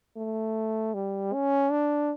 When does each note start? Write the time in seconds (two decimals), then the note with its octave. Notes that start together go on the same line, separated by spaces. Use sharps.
0.17 A3
0.94 G3
1.33 C#4
1.71 D4